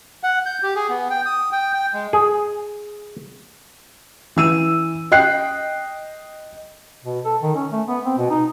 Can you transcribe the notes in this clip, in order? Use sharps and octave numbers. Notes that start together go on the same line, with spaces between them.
F#5
G6
G4
G#4
B3
G5
D#6
G5
G5
G#3
G#4
E3 E6 D#7
D#5 G5 F#6 C7
B2
A4
D#3
C#4
A3
B3
C4
B2
D#4